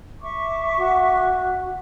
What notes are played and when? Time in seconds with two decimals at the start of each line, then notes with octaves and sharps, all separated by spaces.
0.22 E5 C#6 D6
0.78 F#4